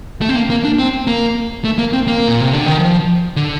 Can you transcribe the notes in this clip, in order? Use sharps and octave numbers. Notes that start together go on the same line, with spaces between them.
A3
C4
A#3
A#3
D4
C4
A#3
A3
A#3
C4
A#3
A#2
C3
D3
D#3
F3
D3